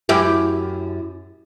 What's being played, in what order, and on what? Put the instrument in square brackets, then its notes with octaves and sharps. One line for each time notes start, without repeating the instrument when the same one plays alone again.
[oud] F#2 E4 G4